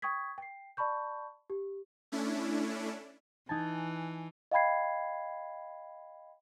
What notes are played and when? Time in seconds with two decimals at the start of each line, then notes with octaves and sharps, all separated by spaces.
0.02 G5 C#6 D#6 G#6 B6
0.38 G5 C7
0.77 D5 A5 B5 C#6 G6
1.50 G4
2.12 A3 C#4 D4 E4
3.49 E3 D#4 G#5 A5
4.52 D#5 F5 G5 B5 G#6 C7